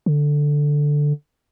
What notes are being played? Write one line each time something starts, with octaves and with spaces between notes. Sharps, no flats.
D3